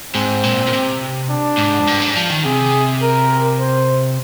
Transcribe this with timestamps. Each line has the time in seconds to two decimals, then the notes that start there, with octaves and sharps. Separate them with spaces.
0.14 G#2 C4
0.44 A#2
0.67 A#2
0.73 C3
1.30 D4
1.58 G#2
1.80 F2
1.87 G2
2.02 G#2
2.16 F3
2.30 D#3
2.45 C3 G#4
3.02 A#4
3.60 C5